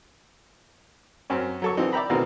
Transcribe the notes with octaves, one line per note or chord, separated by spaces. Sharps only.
F#2 C4 C#4 C#5
F#3 A4 C#6
D3 E3 C4 D#4
D5 E5 G5 A#5 B5
B2 D#3 E3 A3 C4